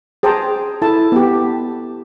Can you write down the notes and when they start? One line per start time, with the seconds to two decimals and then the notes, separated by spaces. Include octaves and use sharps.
0.23 G#4 C5 G5 A5 A#5
0.82 E4 A4 A5
1.12 B3 G4